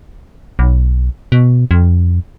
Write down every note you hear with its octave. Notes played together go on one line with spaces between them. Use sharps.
B1
B2
F2